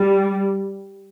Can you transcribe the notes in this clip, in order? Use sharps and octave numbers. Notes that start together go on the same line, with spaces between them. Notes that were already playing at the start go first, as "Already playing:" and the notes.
Already playing: G3